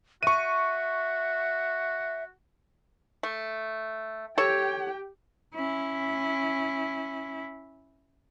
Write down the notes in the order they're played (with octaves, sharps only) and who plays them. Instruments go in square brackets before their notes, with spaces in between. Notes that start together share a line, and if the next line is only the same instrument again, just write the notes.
[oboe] F#4 [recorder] E5 [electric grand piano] C#6 D#7
[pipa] A3
[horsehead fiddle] G4 G5 [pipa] A4 C#5
[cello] C#4 E4